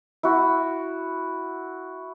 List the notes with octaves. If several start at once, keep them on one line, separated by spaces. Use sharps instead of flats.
E4 F#4